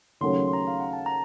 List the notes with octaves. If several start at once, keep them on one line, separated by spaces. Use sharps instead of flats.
D#2 C#3 F#3 A3 C#4 C6
C6
A#5
F5
F#5
A5
A#5